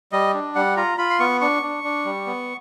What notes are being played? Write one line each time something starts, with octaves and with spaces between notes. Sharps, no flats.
G3 D#5
D4
G3 F#5
F4 A#5
F4 B5
C6
B3 C#6
D4 C#6
D4
D4
G3
B3